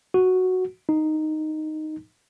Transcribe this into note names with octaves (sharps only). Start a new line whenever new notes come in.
F#4
D#4